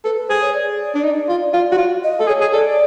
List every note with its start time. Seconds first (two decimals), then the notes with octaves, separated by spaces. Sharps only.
0.04 A4 B4
0.17 B4
0.29 G#4 C5
0.41 C#5
0.54 D5
0.95 D4
1.04 D#4
1.29 F4
1.53 F4
1.72 F#4
1.78 F4
2.04 D#5
2.20 A4
2.27 G#4 C#5
2.41 G#4
2.53 A4 D5